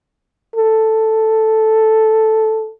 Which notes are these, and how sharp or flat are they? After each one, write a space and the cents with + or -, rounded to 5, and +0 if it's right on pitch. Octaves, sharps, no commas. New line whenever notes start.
A4 +0